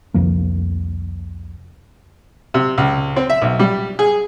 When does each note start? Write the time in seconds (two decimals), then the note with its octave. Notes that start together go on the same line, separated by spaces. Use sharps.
0.14 C2 F2 F3 A#3
2.54 C3
2.78 C#2
3.16 C4
3.30 E5
3.42 B1
3.59 G3
3.99 G#4